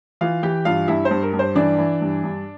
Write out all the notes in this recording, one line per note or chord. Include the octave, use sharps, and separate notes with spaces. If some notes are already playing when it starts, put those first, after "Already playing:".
E3 F4 F5
E3 G4 G5
G2 F4 F5
G2 E4 E5
C5
G2
A#4
G2
C5
E3 D4 D5
E3
G2
G2